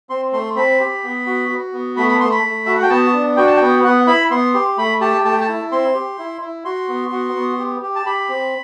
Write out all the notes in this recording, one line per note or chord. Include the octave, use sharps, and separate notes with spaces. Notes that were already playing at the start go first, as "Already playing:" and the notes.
C4 C6
A3 C6
C4 B5
G4
B3
F#4
F#4
B3
A3 B5
B5
A3 C6
B5
A3
F#4 E5
F#5
G5
B3 A5
D4
F#4 G5
A5
G5
B3
B3 F#5
E4 B5
B3 C6
G4
A3 B5
G4 A5
A3 A5
G5
A5
E4
C4 C6
G4
E4
E4
F#4 C6
B3
F#4
B3
G4
G4
A5
G4 B5
C4